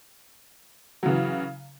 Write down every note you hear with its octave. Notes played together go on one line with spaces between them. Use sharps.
C#3 E3 F#3